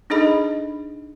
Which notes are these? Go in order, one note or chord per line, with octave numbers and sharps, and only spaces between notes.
D4 D#4 G#4 A4 D#5 B5